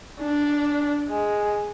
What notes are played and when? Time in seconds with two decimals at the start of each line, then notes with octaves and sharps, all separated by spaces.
0.20 D4
1.09 G#3